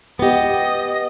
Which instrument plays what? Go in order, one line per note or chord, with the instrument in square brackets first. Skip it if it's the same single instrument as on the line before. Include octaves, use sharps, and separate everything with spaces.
[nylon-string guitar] B3 G4 [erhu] D#5